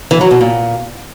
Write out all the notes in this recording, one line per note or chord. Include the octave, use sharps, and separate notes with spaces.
E3
F#3
B2
A#2